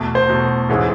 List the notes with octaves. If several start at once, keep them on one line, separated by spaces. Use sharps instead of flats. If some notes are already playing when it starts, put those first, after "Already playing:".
Already playing: E2 B2 A3
C5
E2 B2 A3
A1 G#2 E3 G#3